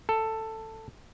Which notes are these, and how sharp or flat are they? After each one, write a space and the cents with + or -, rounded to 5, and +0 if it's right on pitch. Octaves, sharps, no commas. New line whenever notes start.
A4 +10